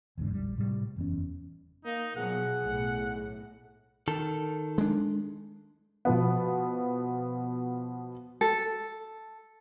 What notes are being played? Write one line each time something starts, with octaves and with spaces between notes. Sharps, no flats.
G1 E2 G#2 D3
A#1 G3
A2 C3 E3 G3
F#1 E2 C#4
A#3 D#4
B2 F3 F#3 G#4 F#5
B1 A2
D#3 A4
G#3 D4
B2 F3 B3
A4